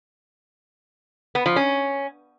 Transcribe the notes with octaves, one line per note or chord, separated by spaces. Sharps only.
B3
F3
C#4